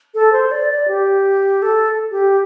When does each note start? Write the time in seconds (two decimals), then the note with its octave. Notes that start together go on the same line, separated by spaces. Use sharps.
0.14 A4
0.32 C5
0.51 D5
0.70 D5
0.88 G4
1.62 A4
2.11 G4